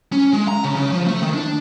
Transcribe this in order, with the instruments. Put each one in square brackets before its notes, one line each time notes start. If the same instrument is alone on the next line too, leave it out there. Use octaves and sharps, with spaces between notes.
[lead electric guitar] C#4
G#3
A#5
C#3
C#3
F3
A3
D#3
D4